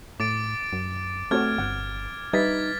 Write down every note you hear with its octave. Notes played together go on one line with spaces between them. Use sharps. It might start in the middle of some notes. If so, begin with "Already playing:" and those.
A2 D6 A6 D7
F#2
A3 C4 F#4 C#5 F6 G#6
G1 F#5
G3 D#4 B4 E5 G#6 A6 B6